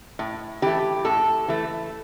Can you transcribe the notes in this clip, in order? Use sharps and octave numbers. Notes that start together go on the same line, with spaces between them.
A2
E3 A3 G4
A2 A4
E3 A3